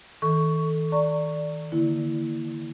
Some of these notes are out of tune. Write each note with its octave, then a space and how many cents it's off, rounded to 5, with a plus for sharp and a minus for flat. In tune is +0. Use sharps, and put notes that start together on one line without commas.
D#3 +40 A4 +0 C#6 +10
D5 +0 A#5 -30 C#6 +0
D3 +0 A#3 +0 E4 +0